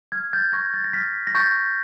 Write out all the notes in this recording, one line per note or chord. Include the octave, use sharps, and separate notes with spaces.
F6 G#6
G6 A6
C#6 G#6 A#6
A6
A#6
F6 A6 B6
A#6
C#6 G6 A6